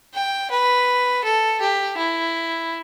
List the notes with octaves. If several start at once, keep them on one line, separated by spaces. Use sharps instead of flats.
G5
B4
A4
G4
E4